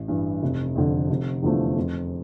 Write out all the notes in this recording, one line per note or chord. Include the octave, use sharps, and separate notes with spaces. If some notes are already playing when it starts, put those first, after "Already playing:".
Already playing: A1
G2 E3
F1
F2 D3
F1
E2 D3 F3 A3
F2